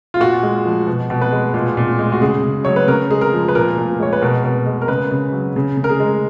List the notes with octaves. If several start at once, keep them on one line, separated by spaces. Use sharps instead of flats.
F4
A#2 F#4
G#3
F3
B2
B2
B4
G#3
A#2
A#2
G#3
F#4
C#3 G#4
C#3
F#3 C#5
B4
C#3 A#4
G#3 G#4
A#4
F3
B4
A#2 A#4
A#2
G#3 C#5
B4
B2 A#4
B2
G#3
A#4
C#3 B4
C#3
F#3
C#3
C#3
A#4
G#4
G#3